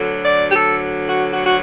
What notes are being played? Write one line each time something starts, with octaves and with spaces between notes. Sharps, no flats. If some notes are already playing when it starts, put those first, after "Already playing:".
Already playing: D2 D3 F#3
D5
G4
A4
F#4
F#4
F#4